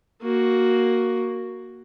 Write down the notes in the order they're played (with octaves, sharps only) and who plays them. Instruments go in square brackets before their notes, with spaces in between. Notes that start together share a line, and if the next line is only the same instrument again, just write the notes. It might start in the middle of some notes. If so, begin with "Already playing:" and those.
[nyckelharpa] A#3 F#4